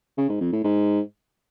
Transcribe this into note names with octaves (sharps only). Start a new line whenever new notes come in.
C#3
G#2
F2
A2
G#2